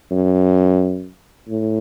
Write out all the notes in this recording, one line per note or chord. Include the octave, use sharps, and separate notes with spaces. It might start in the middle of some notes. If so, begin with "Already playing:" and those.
F#2
A2